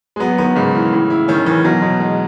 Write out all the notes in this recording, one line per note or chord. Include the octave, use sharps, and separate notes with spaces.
G#3
F#3 B3
D#3 B3
G#2 C#3
E3
A2
E4
D#3 C#4
E3 C#4
B2 F#3
B2
G#3